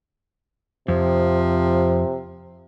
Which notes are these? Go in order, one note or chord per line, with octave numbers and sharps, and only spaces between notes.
F2 C3 F3